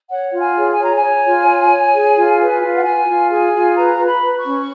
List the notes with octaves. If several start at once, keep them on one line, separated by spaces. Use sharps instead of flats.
C#5 F#5
F4 F#5
G#5
G#4
G#5
C#5
A#5
C#5 G#5
F4
C#5
C#5
G#4
F4
B4
F4
F#5
F4 G#5
F4
G#4 G#5
F4
B4 A#5
B4
B5
B4
C#6
C#4